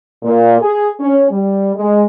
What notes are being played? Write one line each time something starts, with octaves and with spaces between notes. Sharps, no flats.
A#2
G#4
C#4
G3
G#3